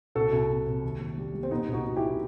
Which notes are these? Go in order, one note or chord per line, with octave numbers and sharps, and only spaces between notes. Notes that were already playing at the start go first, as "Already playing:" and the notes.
C2 F#4 A4
C2
C3
C3
D#2
D#2
G3
G3
C4
B2 B3 D#4
C2
D#4 F#4
B2
E4 G4